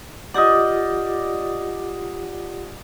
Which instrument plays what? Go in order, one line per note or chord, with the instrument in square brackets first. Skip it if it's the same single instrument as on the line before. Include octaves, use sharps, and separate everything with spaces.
[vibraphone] F4 G4 F#5 [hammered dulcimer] D5 D#5